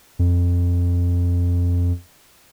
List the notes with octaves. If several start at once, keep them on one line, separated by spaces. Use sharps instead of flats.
F2